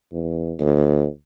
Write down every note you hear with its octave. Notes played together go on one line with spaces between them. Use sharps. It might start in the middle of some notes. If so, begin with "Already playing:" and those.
E2
D2